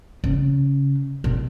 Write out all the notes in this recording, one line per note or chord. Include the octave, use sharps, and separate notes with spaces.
C#3
B2